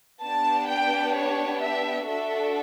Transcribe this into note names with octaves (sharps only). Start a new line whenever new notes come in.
B3 D4 G4 A5
G5
C#5
E5
D4 F#4 A4 E5